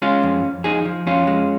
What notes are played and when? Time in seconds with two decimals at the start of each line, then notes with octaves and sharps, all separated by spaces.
0.02 G#3 C#4 F4
0.23 F2
0.44 F2
0.64 F3 D#4 G#4
0.85 F3
1.06 F2 C#4 F4
1.27 G#3